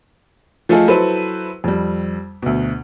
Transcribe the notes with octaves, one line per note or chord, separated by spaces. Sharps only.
F3 A3 F4 G#4 A4 D#5
F#3 E4 A4 B4 C5
F2 G3
D2 B2